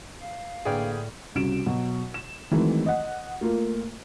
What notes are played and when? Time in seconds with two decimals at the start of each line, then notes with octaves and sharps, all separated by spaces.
0.21 F5
0.65 A2 D3 A#3 G#4 B4 D5 G5 F6
1.35 C2 C#3 F#4 D7 E7
1.66 B2 F#3
2.14 E7
2.51 D#3 E3 F#3 G#3 A3 C4
2.86 D#5 F#5
3.41 A3 A#3 F4